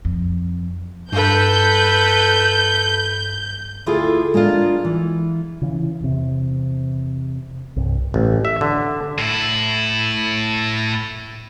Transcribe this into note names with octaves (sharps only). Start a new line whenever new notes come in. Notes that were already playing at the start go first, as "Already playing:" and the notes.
F2
G2 A4 B4 G6
D2 E4 F4 G#4 A4
G#3 A#3 D4 F4
E3
C#3 E3
E2 C3
C2 G2
A1
E5
D3
A2 E4